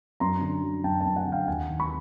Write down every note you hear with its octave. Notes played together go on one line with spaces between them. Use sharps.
F#2 A#5 C6
D3
F#3
F#2 G5 A5
G5 A5
F#2
F#5 G#5
D3
F5 G5
D#2 F#5 G#5
D#3
B5 C#6